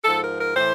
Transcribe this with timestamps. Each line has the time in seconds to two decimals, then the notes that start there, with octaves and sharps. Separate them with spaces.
0.03 G#2 F3 A4
0.21 A#4
0.38 A#4
0.55 A2 E3 C5